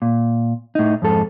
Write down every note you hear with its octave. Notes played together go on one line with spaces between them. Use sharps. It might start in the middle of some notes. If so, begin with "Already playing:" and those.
A#2
A2 D#4
F2 G#2 A4